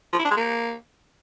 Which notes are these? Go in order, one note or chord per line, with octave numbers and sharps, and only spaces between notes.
F3
E4
D4
G#3
A#3